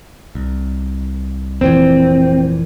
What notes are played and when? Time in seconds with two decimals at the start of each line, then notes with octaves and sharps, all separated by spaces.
0.35 C2
1.61 F1 A#2 E3 C4